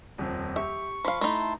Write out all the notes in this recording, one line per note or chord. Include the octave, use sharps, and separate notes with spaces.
D#1 F2 F3
G4 E5 C#6
F3 F5 B5
A3 D#4 E4 A5 C6